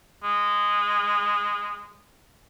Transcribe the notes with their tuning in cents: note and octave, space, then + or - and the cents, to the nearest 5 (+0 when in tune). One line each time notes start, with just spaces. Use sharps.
G#3 -15